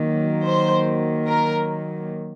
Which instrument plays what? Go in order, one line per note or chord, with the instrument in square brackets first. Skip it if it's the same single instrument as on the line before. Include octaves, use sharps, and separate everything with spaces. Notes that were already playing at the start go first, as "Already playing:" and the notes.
Already playing: [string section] D#3 F#3 A#3
C5
A#4